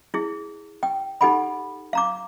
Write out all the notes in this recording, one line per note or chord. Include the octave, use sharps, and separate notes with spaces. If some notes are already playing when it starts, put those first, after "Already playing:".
E4 G#4
G5
D#4 G4 A4 F#5 G#5 B5
F5 A#5 D6